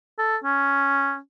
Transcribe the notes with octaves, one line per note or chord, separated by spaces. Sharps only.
A4
C#4